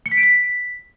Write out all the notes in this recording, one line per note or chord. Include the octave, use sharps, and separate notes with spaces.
C#7
B6
D7
B6